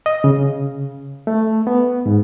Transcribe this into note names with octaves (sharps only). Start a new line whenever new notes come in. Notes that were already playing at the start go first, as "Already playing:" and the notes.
D#5
C#3
A3
B3
G#2